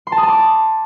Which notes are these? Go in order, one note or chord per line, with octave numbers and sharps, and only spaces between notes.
C6
A5
D#6
A5
D6